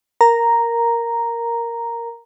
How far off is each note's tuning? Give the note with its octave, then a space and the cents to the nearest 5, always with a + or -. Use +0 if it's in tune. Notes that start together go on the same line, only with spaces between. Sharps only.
A#4 +0 A#5 +0